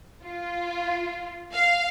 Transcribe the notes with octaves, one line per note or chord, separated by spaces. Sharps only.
F4
F5